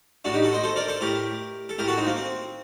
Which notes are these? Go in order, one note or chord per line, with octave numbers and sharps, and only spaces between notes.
A2 D4 F#4
D#4 G4
F#4 A4
C5 D#5
A4 C5
A#4 D5
A4 C5
A2 G4 A#4
A4
A2 G4 A#4
F#4 A4
C4 D#4
A#3
C4